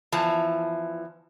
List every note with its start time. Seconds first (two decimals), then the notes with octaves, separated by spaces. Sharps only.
0.12 E2 E3 F3 A5